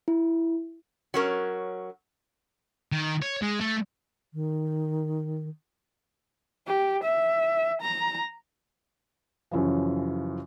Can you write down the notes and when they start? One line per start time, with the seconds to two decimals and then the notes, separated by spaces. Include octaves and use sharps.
0.08 E4
1.14 F#3 C#4 A#4
2.92 D#3
3.22 C#5
3.42 G#3
3.60 A3
4.33 D#3
6.67 G4
7.04 E5
7.82 A#5
9.51 F#2 C#3 E3 F3